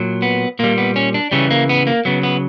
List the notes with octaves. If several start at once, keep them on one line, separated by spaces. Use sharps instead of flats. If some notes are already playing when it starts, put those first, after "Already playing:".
Already playing: A#2 F#3
B3
A#2 G3 A#3
B3
C#4
D4
C#3 E3 G3 C#4
A#3
B3
A#3
C#3 F#3 B3
B3